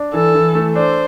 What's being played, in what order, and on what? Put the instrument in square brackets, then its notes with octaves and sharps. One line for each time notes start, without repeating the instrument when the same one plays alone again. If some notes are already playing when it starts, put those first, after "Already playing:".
Already playing: [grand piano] D4
[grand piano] E3 [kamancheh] A4
[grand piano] E3
A3
[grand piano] D4 [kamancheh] C5